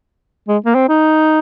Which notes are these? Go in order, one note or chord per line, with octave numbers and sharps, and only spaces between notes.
G#3
A#3
C4
D#4